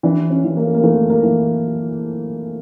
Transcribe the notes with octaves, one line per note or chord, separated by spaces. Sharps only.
E3 D4
C#4
E3
A#3
A3
A#3
E3 A3
A#3
E3